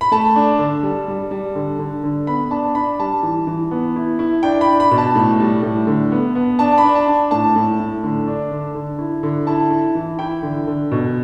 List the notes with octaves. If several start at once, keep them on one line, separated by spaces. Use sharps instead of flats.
B5
A3 A5
D4
D3
G3
G3
G3
D3
D3
D3
B3 B5
D4 A5
D4 B5
G3 A5
E3
E3
B3
E4
E4
D4 G5
B5
D4
B5
B2
A5
A2
G3
A2
D3
B3
B3
D4 A5
B5
D4
A5
D4
A2 A5
A2
A2
D3
D4
D3
D3
E4
D3
E4 A5
E4
E3
E4 G5
D3
D3
B2